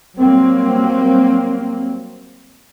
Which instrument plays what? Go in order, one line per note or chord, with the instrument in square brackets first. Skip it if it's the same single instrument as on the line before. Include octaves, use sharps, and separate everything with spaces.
[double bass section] F#3 G3 A#3 C4